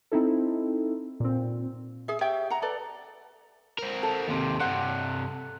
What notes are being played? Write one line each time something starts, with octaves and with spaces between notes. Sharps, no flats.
C4 D#4 E4 A4
A#2 C4
G#4 E5
G4 C#5 E5 G5
F#5 A#5
A4 B4 D5
C4 A#4
A4
D#2 C3
G2 C3 F#5